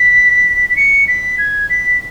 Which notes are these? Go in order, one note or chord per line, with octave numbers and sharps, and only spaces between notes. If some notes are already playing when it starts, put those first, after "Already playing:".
Already playing: B6
B6
C#7
B6
G#6
B6